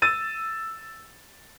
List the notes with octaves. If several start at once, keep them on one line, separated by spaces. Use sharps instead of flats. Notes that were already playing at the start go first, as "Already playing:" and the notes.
E6 A6 D#7